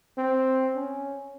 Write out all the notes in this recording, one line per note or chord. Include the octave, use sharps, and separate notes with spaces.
C4
C#4